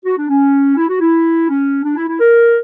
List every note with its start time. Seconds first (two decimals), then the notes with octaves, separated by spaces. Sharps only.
0.05 F#4
0.18 D4
0.29 C#4
0.76 E4
0.88 F#4
1.00 E4
1.48 C#4
1.84 D4
1.96 E4
2.08 E4
2.19 A#4